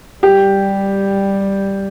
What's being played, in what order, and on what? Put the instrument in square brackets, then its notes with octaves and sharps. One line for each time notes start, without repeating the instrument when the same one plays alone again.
[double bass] G3 [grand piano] G4